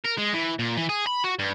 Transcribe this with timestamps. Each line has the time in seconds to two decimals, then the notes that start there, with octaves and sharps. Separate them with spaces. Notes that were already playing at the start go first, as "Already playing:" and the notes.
0.05 A#4
0.18 G#3
0.34 E3
0.59 A#2
0.77 E3
0.89 G#4
1.07 B5
1.24 F#4
1.39 G2